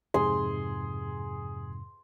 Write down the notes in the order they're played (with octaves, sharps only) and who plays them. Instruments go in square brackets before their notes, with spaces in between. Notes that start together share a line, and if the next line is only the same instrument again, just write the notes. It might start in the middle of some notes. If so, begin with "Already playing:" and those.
[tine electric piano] F2 G#2 C3 [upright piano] G#4 [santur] C6